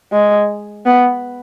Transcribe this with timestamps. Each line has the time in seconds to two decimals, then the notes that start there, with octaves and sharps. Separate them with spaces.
0.12 G#3
0.86 B3